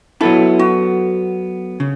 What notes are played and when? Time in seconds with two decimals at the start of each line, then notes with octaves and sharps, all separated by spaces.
0.21 F#3 B3 E4 A4
0.59 F#4
1.80 C#3